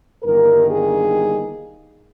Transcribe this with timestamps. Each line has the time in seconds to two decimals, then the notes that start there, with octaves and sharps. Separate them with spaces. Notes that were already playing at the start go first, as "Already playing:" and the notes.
0.23 G1 G2 D#3 A#3 D#4 A#4
0.68 G#4